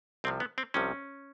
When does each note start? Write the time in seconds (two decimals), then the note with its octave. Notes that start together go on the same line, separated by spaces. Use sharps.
0.24 C2 C3 F3 C4
0.40 B3
0.58 C4
0.74 C2 C3 F3 C#4